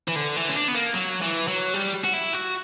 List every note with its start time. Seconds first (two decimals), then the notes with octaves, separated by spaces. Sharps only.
0.08 E3
0.16 D3
0.36 E3
0.49 C#4
0.56 D4
0.68 B3
0.75 A#3
0.94 F#3
1.22 E3
1.48 F#3
1.74 G3
2.04 F#4
2.13 E4
2.33 F#4